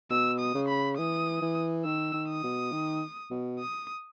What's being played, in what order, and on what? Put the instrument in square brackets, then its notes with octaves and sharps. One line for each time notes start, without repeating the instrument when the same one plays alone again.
[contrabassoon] B2 [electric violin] E6
[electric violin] D#6
[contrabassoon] C#3
[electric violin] B5
[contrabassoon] E3 [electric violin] D#6
[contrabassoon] E3
[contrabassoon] D#3 [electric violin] E6
[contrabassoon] D#3
[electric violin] D#6
[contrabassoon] B2
D#3
B2
[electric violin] D#6